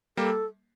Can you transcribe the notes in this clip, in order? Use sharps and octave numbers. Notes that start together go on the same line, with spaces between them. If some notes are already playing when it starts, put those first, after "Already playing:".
G3 A#3 A4